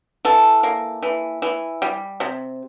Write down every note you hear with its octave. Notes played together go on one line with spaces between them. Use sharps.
E3 A4
A#3
E3
E3
G3
C3